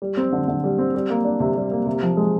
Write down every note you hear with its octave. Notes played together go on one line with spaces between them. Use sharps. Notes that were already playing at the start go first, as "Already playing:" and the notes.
G3
C4
D3
D3
G3
C4
G3
A#3
D4
C3
G3
A#3
C3
F3
G#3